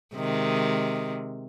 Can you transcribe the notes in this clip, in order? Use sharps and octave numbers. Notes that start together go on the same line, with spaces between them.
C3 D#3 G#3